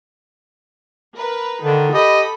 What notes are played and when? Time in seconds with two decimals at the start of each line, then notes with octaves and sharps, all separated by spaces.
1.16 A#4 B4
1.62 D3 D#3
1.94 G4 A4 D#5 B5